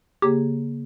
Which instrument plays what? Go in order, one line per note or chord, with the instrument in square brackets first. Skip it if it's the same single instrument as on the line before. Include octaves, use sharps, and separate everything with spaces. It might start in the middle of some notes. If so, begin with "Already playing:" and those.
[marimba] C#3 A#3 G#4 [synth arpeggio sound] G4